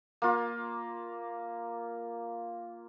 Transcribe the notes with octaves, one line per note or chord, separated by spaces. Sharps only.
A#3 F4